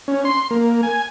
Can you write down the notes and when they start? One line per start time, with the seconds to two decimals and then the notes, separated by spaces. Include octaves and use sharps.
0.08 C#4
0.25 C6
0.51 A#3
0.83 G#5